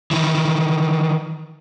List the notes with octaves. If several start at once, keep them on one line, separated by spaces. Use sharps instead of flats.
D#3 E3